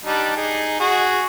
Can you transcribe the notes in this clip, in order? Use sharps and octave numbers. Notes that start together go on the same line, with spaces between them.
G3 D4 D#4
D#4 G#4
F#4 G#4